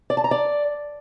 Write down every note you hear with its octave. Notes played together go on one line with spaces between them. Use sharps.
D5
A5
A#5
D5